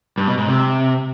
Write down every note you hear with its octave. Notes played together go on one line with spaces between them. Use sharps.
G2
B2
G#2
C3